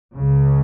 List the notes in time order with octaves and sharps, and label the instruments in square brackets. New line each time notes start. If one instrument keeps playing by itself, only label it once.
[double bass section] C#2 C#3